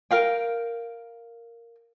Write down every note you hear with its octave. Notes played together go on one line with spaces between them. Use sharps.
A#4 F5 G5